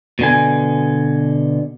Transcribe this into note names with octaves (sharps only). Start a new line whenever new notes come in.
B2 D3 G#5